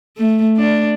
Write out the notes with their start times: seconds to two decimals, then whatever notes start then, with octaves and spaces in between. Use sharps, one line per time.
0.18 A3
0.57 D4